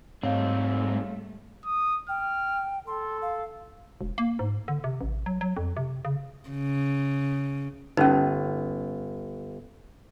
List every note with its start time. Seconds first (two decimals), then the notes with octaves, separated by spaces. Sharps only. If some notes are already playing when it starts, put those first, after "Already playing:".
0.23 G#2 G3 A3 C4 D#4 C#5 F5
1.65 D#6
2.09 G5 F6
2.87 A4 C6
3.22 F5
4.01 E1
4.18 A#3
4.39 G#2
4.68 D3
4.84 C3
5.01 A1
5.26 F#3
5.41 F#3
5.57 F2
5.77 C3
6.05 C#3
6.50 C#3
7.97 G1 C#4 D#4